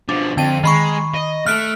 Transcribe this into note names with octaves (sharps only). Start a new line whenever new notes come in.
B2 F3 D4
F2 D3 G5 D#7
D#3 G#3 B5 C#6
D#5
A3 A4 F6 F#6 D7